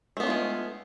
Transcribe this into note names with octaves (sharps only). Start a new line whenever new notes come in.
G#3 A3 B3 D4 F4